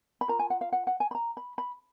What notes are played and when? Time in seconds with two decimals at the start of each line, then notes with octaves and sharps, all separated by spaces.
0.21 B5
0.28 F4 A#4 A#5
0.39 G#5
0.50 F#5
0.61 F5
0.73 F#5
0.87 F#5
1.00 G#5
1.11 B5
1.15 A#5
1.37 B5
1.58 B5